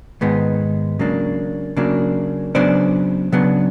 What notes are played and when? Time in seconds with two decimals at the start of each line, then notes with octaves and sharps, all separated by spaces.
0.21 G#2 D#3 G#3 B3 D#4
0.99 C#3 F#3 A#3 D4
1.77 C#3 F#3 A#3 D4
2.55 C#3 F#3 B3 D4 C5 D5
3.32 C#3 F#3 B3 D4